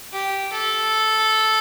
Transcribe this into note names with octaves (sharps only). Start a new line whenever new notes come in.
G4
A4